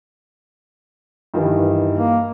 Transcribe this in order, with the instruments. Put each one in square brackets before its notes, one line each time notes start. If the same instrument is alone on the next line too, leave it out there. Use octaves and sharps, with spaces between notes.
[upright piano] G2 D#3 E3
[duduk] A#3